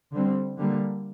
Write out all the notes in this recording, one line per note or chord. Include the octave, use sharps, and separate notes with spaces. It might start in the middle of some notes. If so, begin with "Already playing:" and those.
D3 G3 C4
D3 G3 A#3